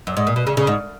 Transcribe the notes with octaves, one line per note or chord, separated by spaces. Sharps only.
F#2
G#2
A#2
B2
C#3
C#3
G#2